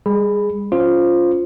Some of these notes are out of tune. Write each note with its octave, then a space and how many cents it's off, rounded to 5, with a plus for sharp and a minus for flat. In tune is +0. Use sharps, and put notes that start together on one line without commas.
G3 +35 G#4 +0 B5 +0
C#4 +20 F4 +0 C5 +0